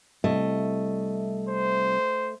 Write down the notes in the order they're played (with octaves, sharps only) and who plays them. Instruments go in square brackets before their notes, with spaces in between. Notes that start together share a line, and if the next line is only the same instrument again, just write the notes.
[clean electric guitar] C2 [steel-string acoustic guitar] A3 D#5
[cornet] C5